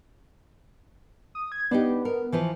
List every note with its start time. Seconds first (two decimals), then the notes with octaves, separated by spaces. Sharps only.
1.35 D#6
1.52 G#6
1.71 B3 D4 D#4 G4
2.05 A#4
2.32 E3 F3 B4